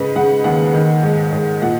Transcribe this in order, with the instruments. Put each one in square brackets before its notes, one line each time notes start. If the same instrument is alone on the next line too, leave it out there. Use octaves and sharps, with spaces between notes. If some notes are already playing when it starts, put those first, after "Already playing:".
Already playing: [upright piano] G#2 C#3 B4
C#3 F#5
D#2 F#5
D#3
G#2
G#2
A#2 F#5